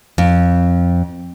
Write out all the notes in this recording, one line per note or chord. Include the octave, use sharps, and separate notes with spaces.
F2